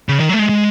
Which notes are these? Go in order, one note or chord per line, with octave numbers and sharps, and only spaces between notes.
C#3
D#3
F#3
A3
G#3
G#3